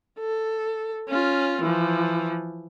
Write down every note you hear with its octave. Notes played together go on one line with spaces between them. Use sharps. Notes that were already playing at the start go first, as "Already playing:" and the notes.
A4
C#4 F4
E3 F3